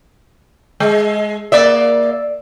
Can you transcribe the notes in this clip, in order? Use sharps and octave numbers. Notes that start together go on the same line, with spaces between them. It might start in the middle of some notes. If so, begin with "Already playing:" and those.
G#3
A#3 D5 E5